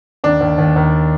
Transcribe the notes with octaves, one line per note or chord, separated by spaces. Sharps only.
D#2 D4
D#2
D#2
D#2